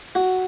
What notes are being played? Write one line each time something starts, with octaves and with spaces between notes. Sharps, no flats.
F#4